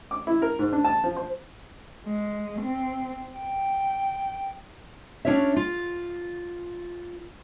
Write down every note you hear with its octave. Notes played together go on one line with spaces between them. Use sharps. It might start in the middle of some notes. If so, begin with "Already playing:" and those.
D6
E4
A#4
G#2
D4
A5
F3
C5
G#3
C4
G5
C#4 D4 F4 C#5 E5
F4